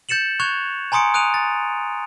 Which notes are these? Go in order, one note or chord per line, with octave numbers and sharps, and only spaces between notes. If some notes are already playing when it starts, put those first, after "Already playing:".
G6 A6 C#7 E7 F#7
C#6 F#6 G#6 F7
G#5 A#5 C6 D#6 C#7 D7
D#6 F#6 D7 D#7 F7
A6